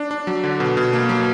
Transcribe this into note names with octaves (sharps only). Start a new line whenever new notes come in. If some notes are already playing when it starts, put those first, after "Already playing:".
Already playing: D4
D4
F#3
D3
B2
B2
A#3
F#3